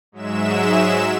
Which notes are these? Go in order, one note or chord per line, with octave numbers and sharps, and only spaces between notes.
G#2 F#3 G#3 E5 E7